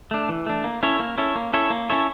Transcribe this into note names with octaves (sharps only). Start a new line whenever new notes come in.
A3 D4
E3
A3 D4
A#3
C#4 E4 A4 C#5
A#3
C#4 E4 A4 C#5
A#3
C#4 E4 A4 C#5
A#3
C#4 E4 A4 C#5